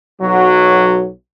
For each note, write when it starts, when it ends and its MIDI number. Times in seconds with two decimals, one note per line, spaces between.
0.20 1.09 35
0.20 1.09 54